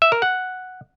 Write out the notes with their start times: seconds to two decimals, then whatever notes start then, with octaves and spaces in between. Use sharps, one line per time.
0.02 E5
0.12 A#4
0.22 F#5